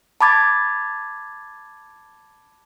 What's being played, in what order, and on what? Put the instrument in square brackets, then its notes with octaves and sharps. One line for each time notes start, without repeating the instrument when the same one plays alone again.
[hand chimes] A5 B5 D6 G#6 A6